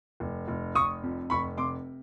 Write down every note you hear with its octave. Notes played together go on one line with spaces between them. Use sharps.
F1
F1
F1 C#6 D#6
F2
F1 B5 C#6
C3 C6 D6